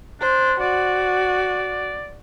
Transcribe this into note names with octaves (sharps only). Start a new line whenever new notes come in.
D4 C5
F#4 D5